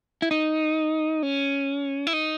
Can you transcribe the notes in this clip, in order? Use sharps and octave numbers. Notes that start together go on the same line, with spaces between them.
E4
D#4
C#4
E4
D#4